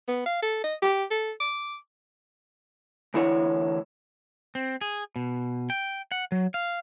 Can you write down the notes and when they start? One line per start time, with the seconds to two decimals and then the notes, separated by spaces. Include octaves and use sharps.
0.08 B3
0.26 F5
0.43 A4
0.64 D#5
0.82 G4
1.11 A4
1.40 D6
3.14 D2 E3 E4 C#5 F#5
4.55 C4
4.81 G#4
5.16 B2
5.70 G5
6.12 F#5
6.32 F#3
6.54 F5